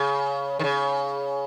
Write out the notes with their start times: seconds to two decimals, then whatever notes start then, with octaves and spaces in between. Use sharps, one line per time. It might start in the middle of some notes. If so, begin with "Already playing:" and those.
Already playing: C#3
0.59 D#3
0.64 C#3